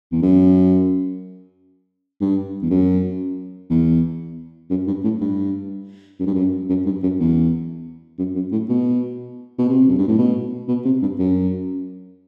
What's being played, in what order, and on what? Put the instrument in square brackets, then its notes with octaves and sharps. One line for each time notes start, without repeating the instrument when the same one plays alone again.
[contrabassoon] E2
F#2
G2
E2
F#2
E2
F#2
G2
A2
G2
F#2
G2
F#2
F#2
G2
F#2
E2
F#2
F#2
A2
B2
B2
C3
F#2
G2
A2
B2
B2
C3
G2
F#2